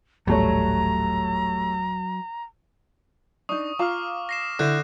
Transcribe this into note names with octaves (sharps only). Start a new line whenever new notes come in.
D#1 A1 F#3 G3 A3 C#5 A#5
D4 D#4 C#6 D#6
F4 F5 A#5 D6 D#6 F6
A#6 C7 E7
D3 E4 F#6 G6 E7